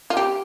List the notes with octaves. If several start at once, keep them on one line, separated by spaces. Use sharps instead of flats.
F4
G4